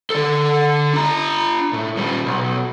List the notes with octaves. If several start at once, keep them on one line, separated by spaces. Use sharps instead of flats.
D3 A4
D4 A#5
A2
A#2 G3
B1